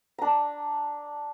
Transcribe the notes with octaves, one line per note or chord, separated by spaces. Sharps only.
D4 A#5